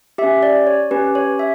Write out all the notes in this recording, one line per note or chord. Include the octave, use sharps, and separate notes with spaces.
C#4 G4 E5
D5
C#5
C#4 G4 B4
C#5
E5